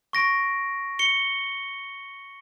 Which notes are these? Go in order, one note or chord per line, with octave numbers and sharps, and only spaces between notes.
C#6 A#6 D7
C#7 G7